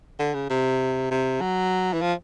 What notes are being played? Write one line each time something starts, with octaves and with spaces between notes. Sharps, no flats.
D3
C#3
C3
C3
F#3
E3
F3